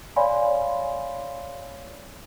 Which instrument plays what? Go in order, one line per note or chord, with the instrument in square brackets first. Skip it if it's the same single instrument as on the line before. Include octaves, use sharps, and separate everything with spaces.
[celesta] C#5 D5 F5 G#5 B5 C6